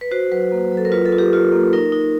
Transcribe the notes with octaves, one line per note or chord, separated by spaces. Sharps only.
B4
F#4 C5
F#3 B4
A#3
F#3
A4
A#4
F4 B4
A4
F4
G4
F4
A#3
D#4 A#4
D#4